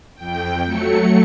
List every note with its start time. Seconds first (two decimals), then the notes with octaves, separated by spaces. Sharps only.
0.15 F2 G5
0.65 F#3 A3 C#7